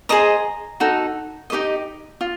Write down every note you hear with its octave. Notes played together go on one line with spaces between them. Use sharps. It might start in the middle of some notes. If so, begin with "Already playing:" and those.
G#4 C5 D#5 A#5
D#4 F#4 A4
D#4 G4 C5 D#5
F4